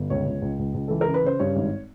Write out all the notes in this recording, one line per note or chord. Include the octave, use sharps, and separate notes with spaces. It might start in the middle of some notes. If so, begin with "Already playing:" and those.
Already playing: G1
C#2 C#5
C#2
C#2
C#2
C#2
E3 A4
A#4
C#3
B4
C#3 C5
G2 C#5
G#1